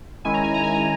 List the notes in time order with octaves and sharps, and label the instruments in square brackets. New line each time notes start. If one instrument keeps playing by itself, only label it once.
[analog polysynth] D#3 G#3 C#4 E4 G#5
A#5
G#5
A#5
G#5
A#5